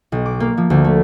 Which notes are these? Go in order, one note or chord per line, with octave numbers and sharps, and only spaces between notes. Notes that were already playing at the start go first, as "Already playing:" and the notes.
B1
D6
A#3
F3
D2
A3